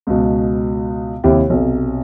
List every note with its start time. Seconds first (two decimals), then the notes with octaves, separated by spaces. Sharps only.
0.07 C#2 B2
1.24 D#2 C3 E4 G4
1.50 B1 C3